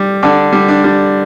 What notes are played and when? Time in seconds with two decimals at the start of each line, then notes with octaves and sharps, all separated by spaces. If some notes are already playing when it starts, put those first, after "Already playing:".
Already playing: G3
0.23 D3 D4
0.52 G3
0.68 D4
0.84 G3